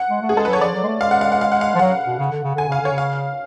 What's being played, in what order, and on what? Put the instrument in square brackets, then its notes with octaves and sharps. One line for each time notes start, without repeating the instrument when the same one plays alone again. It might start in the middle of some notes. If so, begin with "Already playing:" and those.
Already playing: [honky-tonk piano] F#5
[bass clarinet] G#3
A3
[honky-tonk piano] G#4
[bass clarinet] G#3 [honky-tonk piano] A4
[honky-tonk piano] B4
[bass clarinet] F#3 [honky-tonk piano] C#5
[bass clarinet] F3 [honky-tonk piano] D5
[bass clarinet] F#3
G#3
A3
[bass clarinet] G#3 [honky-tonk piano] F5
[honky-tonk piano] F#5
F5
F#5
F5
F#5
F5
[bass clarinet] F3
[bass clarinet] F#3 [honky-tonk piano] F#5
[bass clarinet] B2
C#3
D3
C#3
[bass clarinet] D3 [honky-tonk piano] G#5
[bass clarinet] C#3 [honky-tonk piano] F5
[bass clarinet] D3 [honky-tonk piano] C#5
[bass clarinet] C#3
[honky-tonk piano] F5